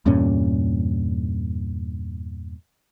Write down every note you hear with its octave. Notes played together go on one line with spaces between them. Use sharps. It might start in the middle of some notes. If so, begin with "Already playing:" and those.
E2 G2 A#2 C#4